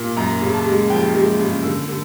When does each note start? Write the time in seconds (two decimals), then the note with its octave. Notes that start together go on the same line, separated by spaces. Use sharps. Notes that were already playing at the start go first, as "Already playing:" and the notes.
Already playing: A#2
0.17 F#2 A#5
0.41 C#3
0.53 A5
0.66 G#3
0.90 F3 G5
1.14 G#3
1.39 C#3
1.63 D3
1.88 D3